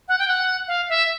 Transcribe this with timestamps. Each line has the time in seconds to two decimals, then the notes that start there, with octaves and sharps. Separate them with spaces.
0.08 F#5
0.19 G5
0.28 F#5
0.68 F5
0.89 E5